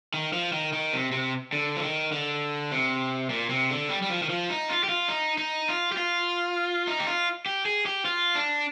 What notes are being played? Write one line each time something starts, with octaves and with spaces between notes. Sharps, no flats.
D#3
F3
D#3
D#3
C3
C3
D3
F3
D#3
D3
C3
A#2
C3
D3
G3
G3
F3
D#3
F3
D#4
F4
G4
F4
D#4
D#4
F4
G4
F4
D#4
G4
F4
G4
G#4
G4
F4
D4